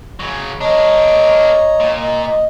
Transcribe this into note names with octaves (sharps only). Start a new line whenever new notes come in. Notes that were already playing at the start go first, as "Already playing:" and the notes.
C#3 F#3
D4 A#4 C#5 D#5 A#5
A#2
D#5
D#5